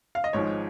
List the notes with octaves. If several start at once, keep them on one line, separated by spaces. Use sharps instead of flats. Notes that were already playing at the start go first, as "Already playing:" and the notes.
F5
D#5
G#1 G#2 F3 G#3 C#5